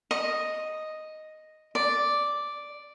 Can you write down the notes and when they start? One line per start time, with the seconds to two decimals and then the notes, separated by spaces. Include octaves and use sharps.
0.11 D#5
1.75 D5